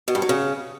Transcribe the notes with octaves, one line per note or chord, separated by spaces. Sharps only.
B2
G2
F#3
C#3